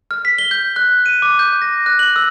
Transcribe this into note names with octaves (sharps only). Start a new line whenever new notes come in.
F6
B6
G7
G6
F#6
D#7
D6
G6
A#6
F#6
F#7
E6